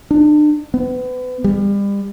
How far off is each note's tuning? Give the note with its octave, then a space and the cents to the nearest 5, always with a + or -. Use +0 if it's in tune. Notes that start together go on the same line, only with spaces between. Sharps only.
D4 +35
B3 +35
G3 +35